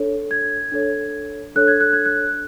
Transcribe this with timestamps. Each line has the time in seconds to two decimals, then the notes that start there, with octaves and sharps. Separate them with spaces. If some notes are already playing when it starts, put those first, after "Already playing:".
Already playing: D4 A4 C#5
0.31 G#6
0.72 D4 A4 C#5
1.55 D4 A4 C#5 F#6
1.68 G#6
1.80 F#6
1.93 G#6
2.06 F#6